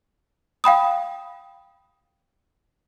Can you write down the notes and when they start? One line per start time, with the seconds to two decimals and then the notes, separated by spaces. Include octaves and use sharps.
0.64 F5 G5 B5 D#6